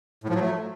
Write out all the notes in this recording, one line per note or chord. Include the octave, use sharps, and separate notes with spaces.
A2
F3
F#3
A3